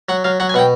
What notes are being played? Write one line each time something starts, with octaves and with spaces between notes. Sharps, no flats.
F#3 F#5
F#3 F5
F#3 F#5
G#5
B2 F#5 G5